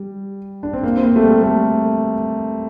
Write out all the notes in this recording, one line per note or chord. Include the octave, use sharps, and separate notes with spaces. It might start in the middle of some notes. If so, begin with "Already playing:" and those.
Already playing: G3
D4
C4
A#3
C4
A#3
A3
G3
A3